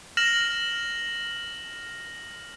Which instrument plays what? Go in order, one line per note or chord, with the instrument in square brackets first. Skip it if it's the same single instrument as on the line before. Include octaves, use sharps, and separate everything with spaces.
[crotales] F6 A#6 E7 F#7